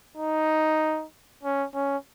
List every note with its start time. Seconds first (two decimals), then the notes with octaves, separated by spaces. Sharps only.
0.17 D#4
1.43 C#4
1.75 C#4